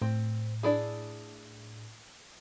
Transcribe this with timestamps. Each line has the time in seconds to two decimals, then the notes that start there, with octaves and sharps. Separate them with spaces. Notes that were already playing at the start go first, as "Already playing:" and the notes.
0.02 A2 C4
0.63 D4 E4 G#4